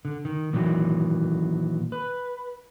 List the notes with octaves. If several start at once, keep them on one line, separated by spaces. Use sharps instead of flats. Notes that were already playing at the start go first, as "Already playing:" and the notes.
D3
D#3
A#2 D#3 E3 F#3
B4